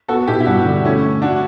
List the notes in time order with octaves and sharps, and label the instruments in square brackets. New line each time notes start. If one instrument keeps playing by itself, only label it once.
[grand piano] B3 [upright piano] F#4 A4
[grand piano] B2 [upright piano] E4 G4
[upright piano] E4
[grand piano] G2 [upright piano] D4 F#4
[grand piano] D3
[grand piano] A3 [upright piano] C#4 E4
[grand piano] A3
[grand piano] A3 [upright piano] D4 F#4